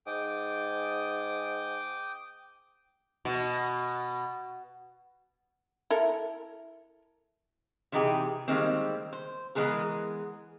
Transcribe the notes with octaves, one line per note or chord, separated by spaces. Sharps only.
G#2 G5 D6 D#6
B2
E4 A4 A#4
C3 E3 D#4 G4 G#4 G5
D#3 F3 G3 G#3 A#3 C4
C5
E3 G#3 B3 G#4 A#4